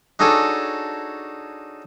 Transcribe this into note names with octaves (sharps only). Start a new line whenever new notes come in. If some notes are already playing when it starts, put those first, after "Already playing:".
D4 D#4 F#4 G#4 A4 C#5